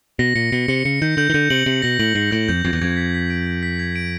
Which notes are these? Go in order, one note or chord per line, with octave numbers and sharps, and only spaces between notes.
B2 A#6
A#2 C#7
B2 C#7
C3 C#7
C#3 C#7
D#3 G6
D3 G6
D#3
D3 G6
C3 F#7
C3 F#7
B2 A#6
A2 F#7
G#2 A#6
A2 G6
F2 G6
F2 A#6
E2
F2 G#6
B6
B6
D7
D7
B6
G#6
D7